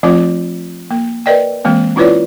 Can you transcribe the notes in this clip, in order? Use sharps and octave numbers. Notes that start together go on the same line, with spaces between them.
F3 A3 C4 F4 C#5 D6
A#3
A#4 B4 D5 D#5 G5
E3 G#3 A#3 C4
C#4 E4 F4 B4 C#5 D5